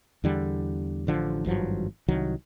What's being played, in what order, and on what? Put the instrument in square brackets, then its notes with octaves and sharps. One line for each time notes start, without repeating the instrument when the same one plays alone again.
[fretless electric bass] E2 D3 G3
A1 D3 F3
G#1 G2 F3 F#3
C2 D#3 F#3